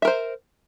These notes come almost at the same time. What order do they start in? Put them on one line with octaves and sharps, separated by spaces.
E5 A#4 C5